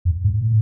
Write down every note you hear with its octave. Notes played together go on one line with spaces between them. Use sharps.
F2
G#2
A2